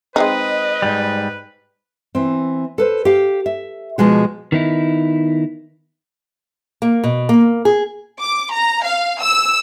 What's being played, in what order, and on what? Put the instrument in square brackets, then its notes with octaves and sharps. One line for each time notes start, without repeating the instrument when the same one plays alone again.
[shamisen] G#3 C4 D#4 [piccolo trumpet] B4 [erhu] D#5
[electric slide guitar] G#2 G3
[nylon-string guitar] E3 C4
A4 B4 C5
G4 F5
E5
B2 F3 G#3 F#4
[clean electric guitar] D#3 B3 D#4 E4
[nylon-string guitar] A#3
B2
A#3
G#4
[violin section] D6
A#5
F5
E6